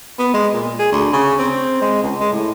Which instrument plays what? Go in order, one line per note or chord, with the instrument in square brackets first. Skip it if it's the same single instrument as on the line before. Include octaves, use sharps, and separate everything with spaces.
[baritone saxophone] B3
G#3
A#2
G#4
D2
C#3
C4
G#3
C#2
G#3
A2